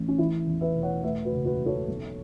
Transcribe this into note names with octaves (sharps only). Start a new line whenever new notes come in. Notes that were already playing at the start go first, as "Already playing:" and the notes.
Already playing: A1 A3
C#4
E3 E4
E2
B4 E5
E1
C#5 F#5
A3 B4 E5
F#4 B4
F#1
F#4 B4
F#1
A4 C#5
B1